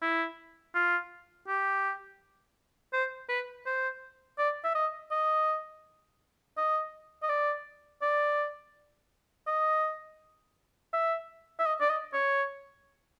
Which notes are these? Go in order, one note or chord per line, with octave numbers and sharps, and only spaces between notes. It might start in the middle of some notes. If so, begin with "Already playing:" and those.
E4
F4
G4
C5
B4
C5
D5
E5
D#5
D#5
D#5
D#5
D5
D5
D#5
E5
E5
D#5
D5
D#5
C#5